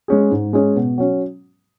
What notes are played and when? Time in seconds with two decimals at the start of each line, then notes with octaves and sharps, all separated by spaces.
0.08 G#3 C#4 G#4
0.31 G#2
0.53 G#3 C#4 G#4
0.76 B2
0.98 F#3 C#4